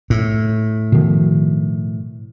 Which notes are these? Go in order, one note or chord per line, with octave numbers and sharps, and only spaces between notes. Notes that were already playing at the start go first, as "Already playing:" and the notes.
A2
B2 D#3 F3